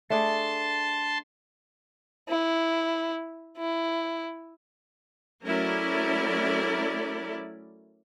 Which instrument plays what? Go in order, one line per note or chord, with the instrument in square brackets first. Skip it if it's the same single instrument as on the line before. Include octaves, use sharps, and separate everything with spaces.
[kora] A3 D4 G#4 [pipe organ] A5 C6
[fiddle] E4
E4
[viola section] F#3 A3 C#4 E4 A#4 D5